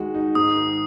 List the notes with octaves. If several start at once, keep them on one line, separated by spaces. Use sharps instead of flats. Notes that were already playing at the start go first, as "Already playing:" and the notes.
Already playing: D#3 G#3 F#4
D#4
G#2 D#6
D#3